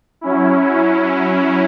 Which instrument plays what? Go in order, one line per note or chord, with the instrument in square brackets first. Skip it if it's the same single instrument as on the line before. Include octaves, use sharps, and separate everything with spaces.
[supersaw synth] F#3 C#4 E4